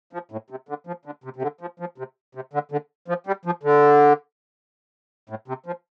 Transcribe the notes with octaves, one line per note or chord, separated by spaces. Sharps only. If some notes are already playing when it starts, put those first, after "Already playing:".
F3
A2
C3
D3
F3
D3
C3
C3
D3
F3
F3
C3
C3
D3
D3
F3
G3
F3
D3
A2
C3
F3